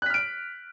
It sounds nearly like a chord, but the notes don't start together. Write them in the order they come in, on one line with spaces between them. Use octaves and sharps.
F#6 B6 F6 D7